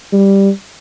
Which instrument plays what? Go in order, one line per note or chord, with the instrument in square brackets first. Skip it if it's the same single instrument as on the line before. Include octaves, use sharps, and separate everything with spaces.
[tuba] G3